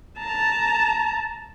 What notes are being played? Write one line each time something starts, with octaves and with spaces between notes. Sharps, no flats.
A5 A#5